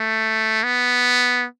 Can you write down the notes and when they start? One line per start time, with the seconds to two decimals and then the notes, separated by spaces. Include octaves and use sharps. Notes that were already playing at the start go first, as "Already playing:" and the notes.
Already playing: A3
0.64 B3